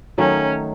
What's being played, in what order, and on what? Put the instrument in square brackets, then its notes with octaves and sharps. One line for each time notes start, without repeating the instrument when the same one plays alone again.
[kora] D#3 F#3 A3 D#4 [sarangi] C#4